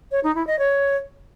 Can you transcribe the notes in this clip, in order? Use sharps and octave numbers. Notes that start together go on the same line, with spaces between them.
C#5
D#4
E4
D#5
C#5